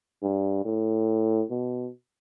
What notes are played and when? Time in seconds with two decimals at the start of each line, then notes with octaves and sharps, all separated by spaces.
0.23 G2
0.65 A2
1.51 B2